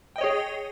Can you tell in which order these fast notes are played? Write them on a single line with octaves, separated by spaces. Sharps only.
G5 D#5 C#5 G#4